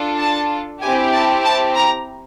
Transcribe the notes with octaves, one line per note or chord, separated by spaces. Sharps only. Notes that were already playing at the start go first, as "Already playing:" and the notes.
Already playing: D4 F4 A4
A5
C4 E4 G4 G#5
A5
A5
A#5